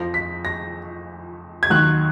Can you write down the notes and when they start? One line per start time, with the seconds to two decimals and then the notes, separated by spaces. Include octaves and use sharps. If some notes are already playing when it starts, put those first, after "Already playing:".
Already playing: F2 F3 A#6
0.14 B6
0.45 A#6
1.63 G#6
1.70 D#2 D#3 F#3 F#6